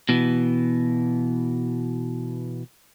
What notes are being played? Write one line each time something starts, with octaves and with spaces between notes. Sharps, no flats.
B2 E3